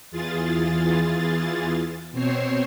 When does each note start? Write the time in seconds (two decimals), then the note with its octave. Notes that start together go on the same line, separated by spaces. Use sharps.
0.11 E2 E3 F4 G#4 A6
2.12 B2 C4 C5 C#5 C6